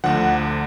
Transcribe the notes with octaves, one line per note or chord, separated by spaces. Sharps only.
D2 D3 F3 F#5